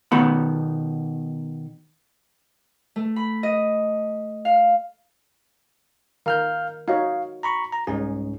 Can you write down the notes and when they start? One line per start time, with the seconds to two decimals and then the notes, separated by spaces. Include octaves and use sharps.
0.12 B2 D#3 B3 B5
2.96 A3
3.16 B5
3.43 D#5
4.45 F5
6.26 D#3 A#4 F5 F6 G6
6.88 D#4 F#4 C#5 F5
7.43 A#5 B5 C#6
7.73 A#5
7.87 C2 G#2 C#4 G#4